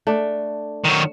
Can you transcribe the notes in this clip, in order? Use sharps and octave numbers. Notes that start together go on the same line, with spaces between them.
A3 D4
D#3 F#3